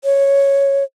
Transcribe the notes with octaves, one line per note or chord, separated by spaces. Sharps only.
C#5